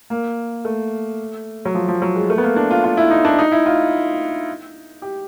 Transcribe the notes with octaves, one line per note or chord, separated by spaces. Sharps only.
A#3
A3
F#3
F3
F3
F#3
G#3
A3
B3
A#3
D4
F4
F4
E4
D#4
D4
D#4
E4
F4
G4